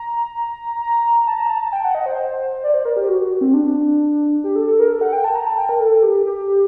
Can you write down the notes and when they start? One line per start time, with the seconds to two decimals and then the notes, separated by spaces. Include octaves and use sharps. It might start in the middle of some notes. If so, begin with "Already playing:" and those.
Already playing: A#5
0.82 A#5
1.27 A5
1.38 A#5
1.49 A5
1.62 A5
1.73 G5
1.84 F#5
1.95 D#5
2.06 C5
2.64 D5
2.74 C5
2.85 A#4
2.97 G4
3.09 F#4
3.41 C4
3.54 D4
4.44 G4
4.56 A4
4.67 A4
4.79 A#4
4.89 A4
5.01 F#5
5.13 G5
5.24 A5
5.35 A#5
5.46 A5
5.58 G5
5.69 A#4
5.80 A4
6.03 G4
6.26 G4